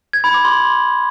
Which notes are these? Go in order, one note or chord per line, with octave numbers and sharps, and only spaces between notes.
G#6
B5
D6
C6